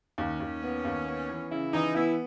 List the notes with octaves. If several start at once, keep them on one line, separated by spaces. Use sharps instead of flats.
D#2 C#4
D#2
B3
D#2
B3
E3
C#3 E4
E3 D#4
B3 E4